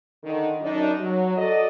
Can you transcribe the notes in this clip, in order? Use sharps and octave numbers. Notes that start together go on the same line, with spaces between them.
D3 D#3
F#2 D4 D#4
F#3
F#4 A4 D5 D#5